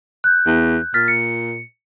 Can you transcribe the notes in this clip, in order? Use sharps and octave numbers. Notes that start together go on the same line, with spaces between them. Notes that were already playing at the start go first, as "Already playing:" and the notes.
F#6 G6
E2
A#2 F6 A6 B6
C#7